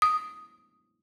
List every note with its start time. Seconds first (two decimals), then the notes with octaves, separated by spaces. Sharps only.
0.02 D#6